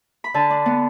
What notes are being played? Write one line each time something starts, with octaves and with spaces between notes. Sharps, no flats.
B5
D3 A5
D4
B3